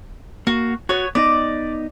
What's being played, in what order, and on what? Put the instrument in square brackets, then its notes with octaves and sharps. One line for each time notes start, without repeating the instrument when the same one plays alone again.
[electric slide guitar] A#3 [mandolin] F#4
[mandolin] B3 C#5 [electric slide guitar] F#4
[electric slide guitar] B3 D#4 D#5 [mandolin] D5